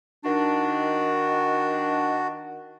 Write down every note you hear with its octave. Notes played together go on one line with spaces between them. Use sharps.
D#3 D4 F#4